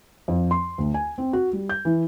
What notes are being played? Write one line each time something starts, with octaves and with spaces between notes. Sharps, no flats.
F2
C6
D2
G#5
C4
F#4
G3
G6
E3